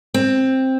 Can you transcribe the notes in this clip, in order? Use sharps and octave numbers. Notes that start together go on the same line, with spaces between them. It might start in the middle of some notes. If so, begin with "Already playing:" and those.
C4